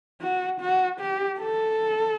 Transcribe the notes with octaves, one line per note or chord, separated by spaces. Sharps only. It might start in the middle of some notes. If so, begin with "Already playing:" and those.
F#4
F#4
G4
A4